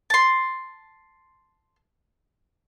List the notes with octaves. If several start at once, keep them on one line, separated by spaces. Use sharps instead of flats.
A5 C6